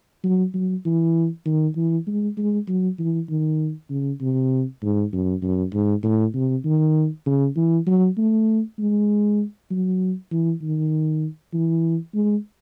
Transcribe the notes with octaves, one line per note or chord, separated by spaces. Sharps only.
F#3
F#3
E3
D#3
E3
G#3
G#3
F#3
E3
D#3
C#3
C3
G#2
F#2
F#2
G#2
A2
C3
D#3
C#3
E3
F#3
A3
G#3
F#3
E3
D#3
E3
G#3